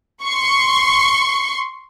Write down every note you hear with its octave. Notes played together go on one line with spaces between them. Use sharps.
C6 C#6